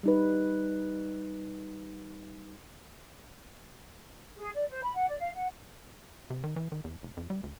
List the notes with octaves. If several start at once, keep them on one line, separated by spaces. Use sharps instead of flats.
G3 D#4 B4
G#4
D5
C5
B5
F#5
D5
F5
F#5
C3
D#3
E3
D#3
E2
F1
F2
G3
D2